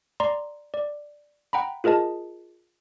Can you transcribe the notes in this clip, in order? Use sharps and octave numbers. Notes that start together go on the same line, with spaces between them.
D5 A#5 C6
D5
F#5 G5 A#5 B5
F4 G#4 A#4 D#5 A5